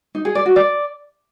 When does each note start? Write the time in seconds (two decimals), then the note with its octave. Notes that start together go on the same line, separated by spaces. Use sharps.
0.15 D#4
0.25 G#4
0.35 D5
0.46 F#4
0.56 D5